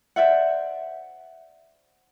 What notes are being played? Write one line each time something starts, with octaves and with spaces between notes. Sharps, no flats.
C5 D5 E5 F#5